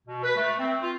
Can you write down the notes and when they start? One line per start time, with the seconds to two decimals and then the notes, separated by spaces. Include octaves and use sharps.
0.07 B2
0.23 B4
0.36 A3
0.58 C4
0.81 F4